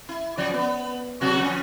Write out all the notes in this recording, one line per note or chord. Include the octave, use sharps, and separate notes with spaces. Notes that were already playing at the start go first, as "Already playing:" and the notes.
E4
F#2 F3 D5
B3
C3 F#3 F#4
F3 C#4